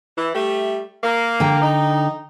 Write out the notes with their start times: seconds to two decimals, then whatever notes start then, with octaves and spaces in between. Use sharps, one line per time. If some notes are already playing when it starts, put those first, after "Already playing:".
0.17 E3
0.34 G3 A3
1.03 A#3
1.40 D3 G5 A#5
1.62 D#4